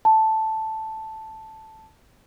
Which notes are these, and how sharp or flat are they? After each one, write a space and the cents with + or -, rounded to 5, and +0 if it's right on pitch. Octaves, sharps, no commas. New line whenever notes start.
A5 +0